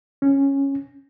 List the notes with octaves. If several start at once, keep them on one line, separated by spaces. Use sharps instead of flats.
C#4